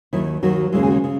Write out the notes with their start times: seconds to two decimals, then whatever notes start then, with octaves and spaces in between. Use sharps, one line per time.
0.13 D#2 D#3 F#3 E4
0.43 D#2 D#3 F#3 F#4
0.72 D#2 C#3 G#3 E4
0.83 G#4
0.87 F#4
1.04 C#3